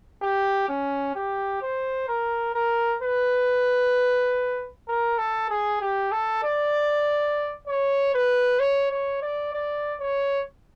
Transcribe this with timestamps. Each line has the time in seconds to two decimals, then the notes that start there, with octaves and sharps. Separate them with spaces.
0.22 G4
0.69 C#4
1.15 G4
1.62 C5
2.08 A#4
2.54 A#4
3.02 B4
4.88 A#4
5.18 A4
5.50 G#4
5.81 G4
6.12 A4
6.43 D5
7.67 C#5
8.14 B4
8.60 C#5
8.91 C#5
9.22 D5
9.53 D5
10.00 C#5